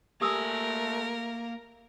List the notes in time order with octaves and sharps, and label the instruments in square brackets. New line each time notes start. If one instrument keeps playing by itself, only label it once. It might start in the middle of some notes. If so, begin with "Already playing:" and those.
[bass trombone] A3 [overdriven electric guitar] A#3 G#5 [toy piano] G4 D#6 E6 [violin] A#4